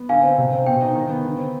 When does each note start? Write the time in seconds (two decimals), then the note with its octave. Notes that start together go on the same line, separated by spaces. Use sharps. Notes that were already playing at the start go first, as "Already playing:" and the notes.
Already playing: B3
0.09 D3 F5 G#5
0.23 C4
0.38 C3
0.53 C4
0.66 B2 G5
0.82 D#4
0.95 D#3
1.10 B3
1.25 D3
1.39 C4